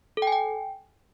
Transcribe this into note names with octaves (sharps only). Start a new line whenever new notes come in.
A4
G5
G#5
G5